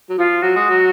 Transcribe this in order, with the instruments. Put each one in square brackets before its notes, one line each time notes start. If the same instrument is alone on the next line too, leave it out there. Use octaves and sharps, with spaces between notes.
[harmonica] F#3
[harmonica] F3 [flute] F4
[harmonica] F#3 [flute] F#4
[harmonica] G#3
F#3